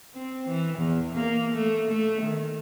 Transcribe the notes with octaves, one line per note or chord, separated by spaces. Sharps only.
C4
E3
E2
A#3
A3
A3
D#3